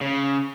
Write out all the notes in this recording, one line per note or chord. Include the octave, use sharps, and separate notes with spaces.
C#3